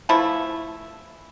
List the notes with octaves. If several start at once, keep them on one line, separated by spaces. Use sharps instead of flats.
E3 F3 A3 E4